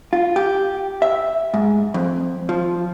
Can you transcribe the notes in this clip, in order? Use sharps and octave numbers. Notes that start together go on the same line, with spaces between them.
F4
G4
E5
G#2
F2
F3